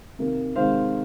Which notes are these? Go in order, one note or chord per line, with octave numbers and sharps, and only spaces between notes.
C3 D#3 A#3
C3 D#3 G#3 C5 F5